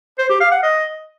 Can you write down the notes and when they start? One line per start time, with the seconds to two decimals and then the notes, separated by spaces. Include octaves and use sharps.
0.19 C5
0.30 G4
0.41 F5
0.52 F#5
0.63 D#5